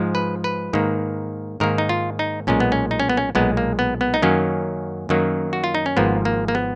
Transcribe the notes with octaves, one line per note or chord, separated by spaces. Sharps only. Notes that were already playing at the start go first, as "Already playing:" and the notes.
Already playing: G#2 F3 G#3
B4
B4
G#2 D#3 A#3
G#2 D#3 A#3 A#4
D#4
F4
D#4
B1 A#2 G#3 C#4
B3
C#4
D#4
C#4
B3
C#4
B1 A#2 G#3 B3
A#3
B3
B3
D#4
F#2 D#3 F#3 A#3 C#4
F#2 D#3 F#3 A#3
F#4
F4
D#4
C#4
G#1 G#2 F3 A#3 B3
A#3
A#3
B3